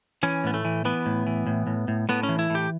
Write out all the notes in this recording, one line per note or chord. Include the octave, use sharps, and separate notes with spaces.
E3 C#4
A2 B3
A3
E3
E3 B3
A2
E3
A2
A2
A2
A2 B3
C#4
E3
E4
A2 G4